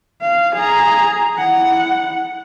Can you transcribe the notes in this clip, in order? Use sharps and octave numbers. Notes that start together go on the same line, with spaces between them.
F5
G#4 A#5
E4 F#5